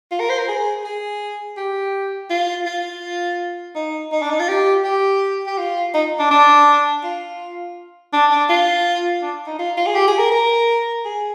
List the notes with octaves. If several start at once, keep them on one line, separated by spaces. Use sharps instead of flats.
F4
A#4
C5
A#4
G#4
G#4
G4
F4
F4
D#4
D#4
D4
D#4
F4
G4
G4
G4
F4
D#4
D4
D4
F4
D4
D4
F4
D4
D#4
F4
F4
G#4
G4
G#4
A#4
A#4
G#4